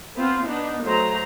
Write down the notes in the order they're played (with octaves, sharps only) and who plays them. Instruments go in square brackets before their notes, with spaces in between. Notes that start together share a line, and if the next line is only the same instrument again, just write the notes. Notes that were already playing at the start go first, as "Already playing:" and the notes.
[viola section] B3 C4 F4
B3 D4 D#4
F#3 A3 C5 A#5